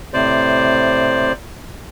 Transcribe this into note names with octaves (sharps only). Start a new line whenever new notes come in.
A2 C3 C5 D5